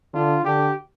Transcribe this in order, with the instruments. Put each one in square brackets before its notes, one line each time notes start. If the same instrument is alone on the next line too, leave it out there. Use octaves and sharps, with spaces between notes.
[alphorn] D3 [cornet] F4
[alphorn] D3 [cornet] G4